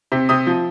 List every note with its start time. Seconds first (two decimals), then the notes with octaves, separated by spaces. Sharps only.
0.12 C3
0.29 C3 D#6
0.47 F3